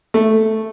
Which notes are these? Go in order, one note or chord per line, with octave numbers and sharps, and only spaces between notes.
A3